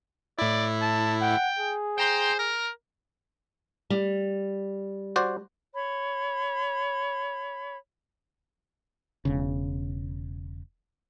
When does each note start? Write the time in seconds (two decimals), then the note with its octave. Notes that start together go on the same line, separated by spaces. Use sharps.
0.39 A2 E4 D5
0.81 A5
1.21 F#5 G5
1.59 G#4
1.98 C5 G5 A#5 C6
2.39 A#4 A#6
3.90 G3
5.16 F#4 C5 D5
5.74 C#5 B5
9.25 E1 C#3